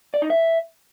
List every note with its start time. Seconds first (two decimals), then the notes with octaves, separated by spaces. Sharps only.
0.14 D5
0.22 D#4
0.30 E5